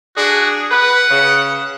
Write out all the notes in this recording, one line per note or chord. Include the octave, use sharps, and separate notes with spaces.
D4 F#4 G#4
B4 F#5
C#3